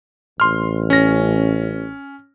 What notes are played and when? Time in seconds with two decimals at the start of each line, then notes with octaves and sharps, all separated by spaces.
0.40 A1 C6 F6
0.90 C#4 A#6